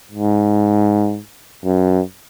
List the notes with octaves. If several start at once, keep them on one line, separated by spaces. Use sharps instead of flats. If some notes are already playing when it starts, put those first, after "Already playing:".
G#2
F#2